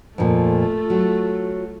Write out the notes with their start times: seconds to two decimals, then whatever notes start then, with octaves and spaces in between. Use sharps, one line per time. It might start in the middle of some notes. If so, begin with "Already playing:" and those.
0.18 F2 A#2 A3 F4
0.90 F#3